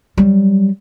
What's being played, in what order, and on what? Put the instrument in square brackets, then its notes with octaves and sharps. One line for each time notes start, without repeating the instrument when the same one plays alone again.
[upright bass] F#3 G3